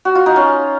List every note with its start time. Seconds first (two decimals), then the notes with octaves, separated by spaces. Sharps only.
0.05 F#4
0.15 F4
0.26 D#4
0.36 C#4